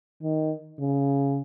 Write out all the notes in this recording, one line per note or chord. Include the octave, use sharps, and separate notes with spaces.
D#3
C#3